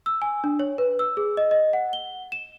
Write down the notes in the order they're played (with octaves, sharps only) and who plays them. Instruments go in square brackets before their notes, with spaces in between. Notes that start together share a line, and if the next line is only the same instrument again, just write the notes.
[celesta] E6
G#5
D4
C#5
B4
E6
G#4
D#5
D#5
F#5
G7
E7